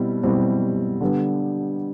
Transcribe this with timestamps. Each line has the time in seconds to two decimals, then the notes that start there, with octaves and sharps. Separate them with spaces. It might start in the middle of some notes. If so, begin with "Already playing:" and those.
Already playing: B2 G3 C4 E4
0.23 B2 G3 C4 E4
1.01 D3 G3 B3